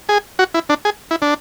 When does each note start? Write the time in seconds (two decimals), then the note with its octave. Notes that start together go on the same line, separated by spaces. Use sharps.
0.09 G#4
0.39 F#4
0.54 E4
0.69 D4
0.85 G#4
1.11 E4
1.22 D4